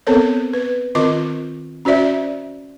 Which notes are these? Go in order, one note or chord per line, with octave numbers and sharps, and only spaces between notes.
B3 C4 A4 A#4 C5 C#5
B4
D#3 C4 F4 A#4 D#5 D6
C#4 F#4 C5 D5 E5